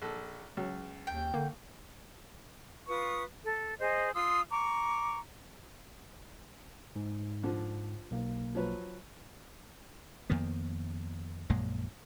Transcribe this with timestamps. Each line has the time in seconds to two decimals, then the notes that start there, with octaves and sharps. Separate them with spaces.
0.02 A#1 A4
0.57 C#2 F#3
1.07 D#2 G5
1.34 D3 A#3
2.88 F4 B4 C#6 D#6
3.45 A4
3.79 G#4 C5 D#5
4.14 F4 C6 D#6 E6
4.51 A#5 C#6 D6
6.96 G#2
7.43 D3 F3
8.11 B1 A#3
8.55 F3 F#3 B4
10.30 F2 D#3 A#3 B3
11.50 A#1 F#2 A#2 G#3